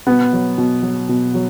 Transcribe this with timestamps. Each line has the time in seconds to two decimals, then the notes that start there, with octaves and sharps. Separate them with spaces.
0.07 B2 B3
0.33 F#3
0.58 B2
0.82 F#3
1.09 B2
1.34 F#3